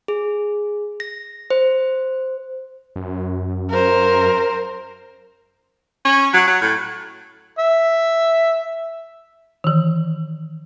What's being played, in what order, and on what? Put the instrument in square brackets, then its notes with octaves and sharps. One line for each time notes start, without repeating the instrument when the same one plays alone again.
[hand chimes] G#4
A#6
C5
[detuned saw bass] F#2
[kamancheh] A#4 C5
[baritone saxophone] C#4
F#3
F#3
A2
[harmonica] E5
[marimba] D#3 E3